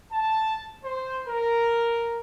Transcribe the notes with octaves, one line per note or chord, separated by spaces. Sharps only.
A5
C5
A#4